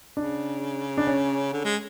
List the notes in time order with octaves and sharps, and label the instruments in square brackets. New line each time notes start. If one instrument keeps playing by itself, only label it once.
[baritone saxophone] C#3 [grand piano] D4
[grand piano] D4
C#4
[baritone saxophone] D3
G#3